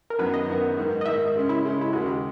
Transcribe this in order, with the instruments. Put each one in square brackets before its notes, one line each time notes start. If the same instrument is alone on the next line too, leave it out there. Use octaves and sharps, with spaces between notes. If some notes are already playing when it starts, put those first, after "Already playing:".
[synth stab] A#4
[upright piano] F#2 D#3 F#3 B3 [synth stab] B4
[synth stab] D#5
[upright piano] F#2 D#3 F#3 B3
G#2 D#3 A#3
[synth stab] D#5
[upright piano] G#2 D#3 A#3 [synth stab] E5
[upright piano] C#3 G#3 C#4
[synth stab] E4
[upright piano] C#3 G#3 C#4
[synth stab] E4
[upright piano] D#2 C#3 G#3 [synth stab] F#4